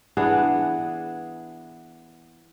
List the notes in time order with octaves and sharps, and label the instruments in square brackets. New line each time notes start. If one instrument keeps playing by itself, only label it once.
[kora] E3 B3 D4 G#4